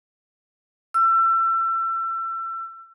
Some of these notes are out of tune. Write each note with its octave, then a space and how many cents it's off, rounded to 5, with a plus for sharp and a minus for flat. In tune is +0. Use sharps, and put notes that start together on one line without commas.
E6 +30